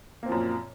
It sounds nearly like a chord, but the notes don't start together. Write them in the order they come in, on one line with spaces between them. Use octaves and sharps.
A#3 C4 F3 F#2 A#2